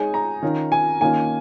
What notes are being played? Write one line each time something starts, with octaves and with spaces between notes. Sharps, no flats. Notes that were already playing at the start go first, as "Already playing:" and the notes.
Already playing: G#3 D#4 G#4 C#5 G#5
A#5
D#3 C#4 F4
G#5
D#3 A#3 C#4 F4 G#5